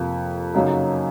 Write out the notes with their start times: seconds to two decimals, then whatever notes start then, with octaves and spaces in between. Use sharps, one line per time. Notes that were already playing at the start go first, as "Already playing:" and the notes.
Already playing: F2 C3 F3 A#3
0.54 F#2 C#3 F#3 A#3 D#4